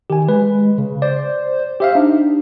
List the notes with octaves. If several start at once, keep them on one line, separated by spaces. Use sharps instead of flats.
D#3 G4 G#5
G#3 B4
C#3
C5 D5
G4 C5 E5 F5
D4 D#4